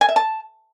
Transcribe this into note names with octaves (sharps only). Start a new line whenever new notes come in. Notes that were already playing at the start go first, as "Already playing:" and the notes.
G#5
E5
A5